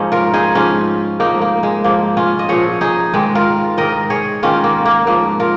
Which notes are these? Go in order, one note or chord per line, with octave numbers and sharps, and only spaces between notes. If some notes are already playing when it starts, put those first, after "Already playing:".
Already playing: G#2 F3 A#3 C#4 D#4
F4 A#4
D#4 G#4
G#2 F3 C#4 F4
G#2 F3 A#3 D#4
A#3
G#3
G#2 F3 A#3
C#4 F4
D#5
A#2 F3 G#4 C#5
D#4 G#4
G#2 D#3 G#3
F4 A#4
G#2 D#3 A#4 D#5
G#4 C#5
G#2 D#3 C#4 F4
A#3
A#3
G#2 F3 A#3
F4 A#4